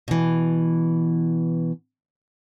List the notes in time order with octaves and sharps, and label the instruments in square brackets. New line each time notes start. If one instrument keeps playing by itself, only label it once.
[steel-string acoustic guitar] B2 E3